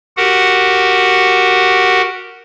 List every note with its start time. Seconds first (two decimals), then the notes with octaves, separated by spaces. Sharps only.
0.17 F#4 G4 A#4 F#5